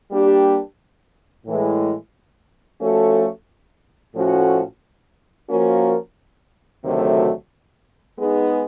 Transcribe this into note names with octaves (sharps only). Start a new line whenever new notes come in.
G3 A#3 D4 G4
A2 E3 G#3
F3 A3 C#4 F#4 A4
A2 F3 A3 C#4 F#4
F3 A#3 C#4 F#4 A#4
D2 C3 D#3 F#3 A3
G#3 B3 D#4 G#4